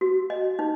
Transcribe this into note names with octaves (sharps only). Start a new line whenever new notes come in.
F#4
D#5
D#4